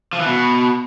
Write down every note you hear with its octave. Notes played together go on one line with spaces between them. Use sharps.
F3
E3
B2